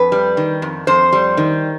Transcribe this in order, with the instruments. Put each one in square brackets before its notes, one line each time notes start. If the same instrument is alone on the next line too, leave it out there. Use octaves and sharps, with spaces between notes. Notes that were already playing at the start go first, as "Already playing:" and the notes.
Already playing: [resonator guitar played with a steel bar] F2 B4
G3
D#3
F2
F2 C5
G3
D#3